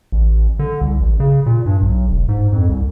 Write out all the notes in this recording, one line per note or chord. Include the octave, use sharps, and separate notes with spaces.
A1
D3
C2
A1
C#3
A#2
G2
B1
E1
G#2
F2
C2